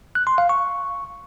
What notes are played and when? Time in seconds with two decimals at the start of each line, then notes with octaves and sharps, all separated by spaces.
0.15 F#6
0.27 C6
0.38 F5
0.49 C#6